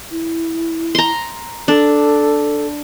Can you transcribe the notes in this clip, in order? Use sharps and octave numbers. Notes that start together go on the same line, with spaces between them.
E4
A#5 C6
D4 A4